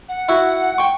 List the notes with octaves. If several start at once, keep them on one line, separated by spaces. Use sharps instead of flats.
F#5
E4 F#4
G5 C#6